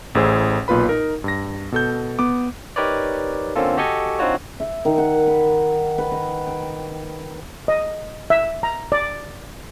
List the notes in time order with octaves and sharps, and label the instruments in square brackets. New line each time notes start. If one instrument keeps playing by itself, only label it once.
[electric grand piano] A1 A2 G#4 C5 E6
B1 A#2 F4 B4 B5
D#4 A#4
G2 A#6
B2 A4 G6
B3 D6
[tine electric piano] D#4 G4 A#4 B4 C#5 D5
D3 A#3 C4 C#4 F4 A4
F#4 G4 A4 D#5 G#5 C#6
C4 D4 D#4 F4 F#4 C#5
[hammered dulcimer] E5
D#3
F#5
B5
B4
D#5
G5
[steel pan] D#5
E5
A#5
D5